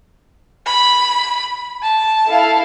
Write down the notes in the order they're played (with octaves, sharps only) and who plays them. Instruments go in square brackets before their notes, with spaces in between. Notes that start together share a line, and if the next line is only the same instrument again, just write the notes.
[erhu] B5
A5
[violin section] E4 A4 F5